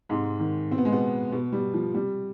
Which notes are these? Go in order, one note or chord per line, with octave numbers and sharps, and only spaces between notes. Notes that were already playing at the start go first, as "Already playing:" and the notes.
G#2 C3 G#3
D#3
B2 C4
B3
G#3
B2 B3
B2 B3
G3
F3
C3 G3